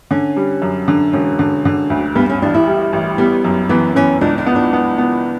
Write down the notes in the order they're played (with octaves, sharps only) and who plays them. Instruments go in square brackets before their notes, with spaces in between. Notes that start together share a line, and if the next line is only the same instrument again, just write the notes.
[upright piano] D3 [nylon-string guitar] C#4
[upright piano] G3
F#2
D3
[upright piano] E1 [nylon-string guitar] C#4
[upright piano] D3
D3
D2
[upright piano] G2 [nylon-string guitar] B3
[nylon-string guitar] C#4
[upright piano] A1 [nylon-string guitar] D4
[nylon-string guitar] E4
[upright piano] G3
A1
[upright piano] G3 [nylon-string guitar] B3
[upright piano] F#2
[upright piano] E3 [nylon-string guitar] B3
[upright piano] E3 [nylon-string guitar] C#4
[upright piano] C#2 [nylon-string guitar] D4
[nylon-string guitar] D4
[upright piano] B3
[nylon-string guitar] D4
[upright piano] B3
B3